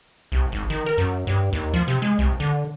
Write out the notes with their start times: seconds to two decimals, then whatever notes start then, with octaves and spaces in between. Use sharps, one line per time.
0.32 C2
0.52 G#1
0.70 D#3
0.86 A#4
0.98 F#2
1.27 G2
1.53 D#2
1.74 F3
1.88 C3
2.02 G#3
2.19 C2
2.40 D3